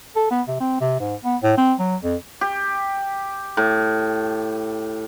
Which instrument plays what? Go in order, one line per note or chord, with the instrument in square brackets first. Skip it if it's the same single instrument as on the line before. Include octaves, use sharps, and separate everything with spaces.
[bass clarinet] A4
B3
C3
C4
C3
G#2
B3
A2
C4
F#3
F2
[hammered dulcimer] G4
A2